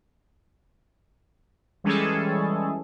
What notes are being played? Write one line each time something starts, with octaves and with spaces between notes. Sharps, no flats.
E3 G3 G#3 C#4 G#4 A4